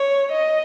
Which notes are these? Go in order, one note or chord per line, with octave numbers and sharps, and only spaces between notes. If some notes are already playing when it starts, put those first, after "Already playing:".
Already playing: C#5
D#5